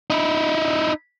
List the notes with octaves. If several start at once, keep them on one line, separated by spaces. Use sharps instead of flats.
D#4 E4